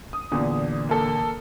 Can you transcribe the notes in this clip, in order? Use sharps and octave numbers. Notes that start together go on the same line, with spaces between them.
D#6
E2 A#2 D3
A#3 A4